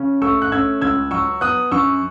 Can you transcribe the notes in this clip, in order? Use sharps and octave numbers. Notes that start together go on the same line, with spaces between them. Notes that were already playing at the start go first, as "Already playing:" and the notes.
Already playing: C#3 C#4
A3 C#6 E6
F#6
C#4 E6 G#6
C#2 E6 G#6
F#3 C#6 E6
B3 D#6 F#6
F#2 C#6 E6